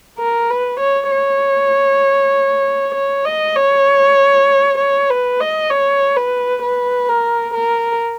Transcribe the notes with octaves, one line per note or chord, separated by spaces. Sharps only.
A#4
B4
C#5
C#5
C#5
D#5
C#5
C#5
B4
D#5
C#5
B4
B4
A#4
A#4